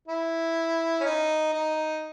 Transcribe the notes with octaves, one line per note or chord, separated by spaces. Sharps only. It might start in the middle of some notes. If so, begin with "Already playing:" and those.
E4
C#4
D#4
D#4